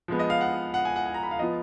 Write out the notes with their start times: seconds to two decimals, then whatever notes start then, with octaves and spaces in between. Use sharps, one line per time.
0.08 F3 G#3 B3
0.19 D#5
0.30 F5
0.41 F#5
0.74 F#5
0.85 G#5
0.96 F#5
1.06 G#5
1.14 A#5
1.23 B5
1.31 F5
1.39 F3 B3 F4 D#5